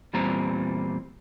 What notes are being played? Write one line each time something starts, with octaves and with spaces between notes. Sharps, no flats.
E2 A#2 G3 C4 A#5